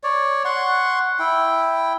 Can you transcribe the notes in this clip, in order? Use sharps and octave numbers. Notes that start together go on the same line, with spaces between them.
C#5 D5
F#5 C6 C#6
E4 G5